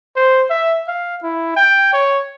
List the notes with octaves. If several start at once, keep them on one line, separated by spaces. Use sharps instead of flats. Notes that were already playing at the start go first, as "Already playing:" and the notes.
C5
E5
F5
E4
G5
C#5